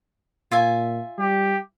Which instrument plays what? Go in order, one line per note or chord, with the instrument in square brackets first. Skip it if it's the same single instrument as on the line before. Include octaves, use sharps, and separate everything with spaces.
[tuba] A#2 [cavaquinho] F4 E5 G#5
[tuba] G3 [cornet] G4